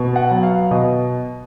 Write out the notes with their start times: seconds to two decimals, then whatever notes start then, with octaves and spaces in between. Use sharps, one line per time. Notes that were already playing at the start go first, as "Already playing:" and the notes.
Already playing: B2
0.16 F#5
0.30 F#3 B3
0.43 F5
0.71 B2 D#5